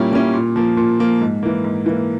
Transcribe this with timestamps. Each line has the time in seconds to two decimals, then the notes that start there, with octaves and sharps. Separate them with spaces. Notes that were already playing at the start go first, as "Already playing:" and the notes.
Already playing: A#2 G3 A#3 C#4 E4
0.12 G3 A#3 C#4 E4
0.34 A#2
0.56 F3 A#3
0.77 A#2
0.99 F3 A#3
1.21 G#2
1.43 E3 A#3
1.64 G#2
1.86 E3 A#3